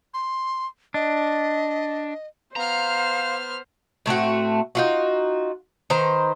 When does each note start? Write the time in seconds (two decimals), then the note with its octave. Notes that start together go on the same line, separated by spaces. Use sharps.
0.14 C6
0.94 D4 D#5
2.56 B3 C5 F5 A#5 F6
4.06 A2 A3 C4 F#4
4.75 D#4 F4 F#4
5.90 D#3 B4 C5 A#5